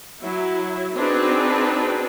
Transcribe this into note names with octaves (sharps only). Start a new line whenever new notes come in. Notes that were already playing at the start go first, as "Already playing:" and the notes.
F#3 E4
C4 D4 D#4 F#4 G#4 B4